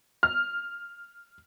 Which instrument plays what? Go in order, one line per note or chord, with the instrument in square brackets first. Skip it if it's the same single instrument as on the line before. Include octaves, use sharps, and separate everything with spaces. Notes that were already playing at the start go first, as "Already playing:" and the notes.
[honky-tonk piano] F6